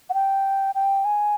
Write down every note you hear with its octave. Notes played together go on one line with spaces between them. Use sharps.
F#5
G5
G5
G#5